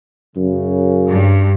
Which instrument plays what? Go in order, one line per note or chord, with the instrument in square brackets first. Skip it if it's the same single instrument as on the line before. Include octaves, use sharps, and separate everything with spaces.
[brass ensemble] F#2 C#3
[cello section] G2